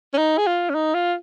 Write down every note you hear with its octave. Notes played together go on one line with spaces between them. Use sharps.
C#4
D#4
G#4
F4
C#4
D#4
F4